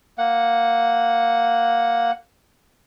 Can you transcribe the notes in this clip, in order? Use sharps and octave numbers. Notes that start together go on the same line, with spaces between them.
A#3 F#5